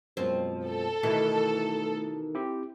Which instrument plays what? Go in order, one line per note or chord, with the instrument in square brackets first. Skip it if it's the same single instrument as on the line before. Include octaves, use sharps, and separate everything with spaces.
[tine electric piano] F#2 B2 G#3 [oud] F3 C4
[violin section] A4
[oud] B2 D#3 E3 [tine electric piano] A3 E4
[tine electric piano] C4 E4 G4